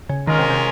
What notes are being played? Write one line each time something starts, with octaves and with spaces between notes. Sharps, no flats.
C#3
D#3 G#3 C#4 F4 A#4
C3
C3